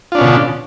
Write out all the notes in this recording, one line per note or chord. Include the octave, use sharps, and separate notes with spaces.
B2 D3 C#4 D4 F4